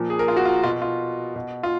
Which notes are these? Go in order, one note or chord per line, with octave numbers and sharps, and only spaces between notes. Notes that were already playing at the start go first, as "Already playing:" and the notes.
Already playing: A#2 F3
G#4
A#4
F4
F#4
F4
B2 F4
F4
B2
F4